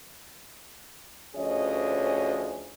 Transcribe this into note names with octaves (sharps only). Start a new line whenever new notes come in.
D2 F3 C#4 G#4 C#5 D#5